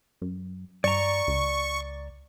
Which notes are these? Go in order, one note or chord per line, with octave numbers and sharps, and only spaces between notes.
F#2
G2 D5 A#5 C#6
C#2